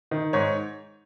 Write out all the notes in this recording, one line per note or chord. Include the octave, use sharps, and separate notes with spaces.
D#3
G#2 C#5